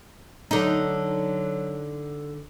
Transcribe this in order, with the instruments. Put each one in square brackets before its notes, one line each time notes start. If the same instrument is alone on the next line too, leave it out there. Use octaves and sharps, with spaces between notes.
[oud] D3 D#4 [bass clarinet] F#3